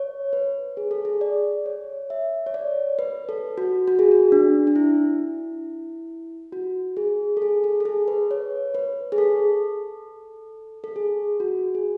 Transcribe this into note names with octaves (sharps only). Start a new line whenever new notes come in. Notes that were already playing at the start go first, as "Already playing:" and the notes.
Already playing: C#5
B4
G#4
A4
G#4
D5
C#5
E5
C#5
D5
B4
A4
F#4
F#4
G#4
F#4
D4
D4
E4
F#4
G#4
A4
G#4
A4
A4
G#4
B4
C#5
B4
G#4
A4
A4
G#4
F#4
G#4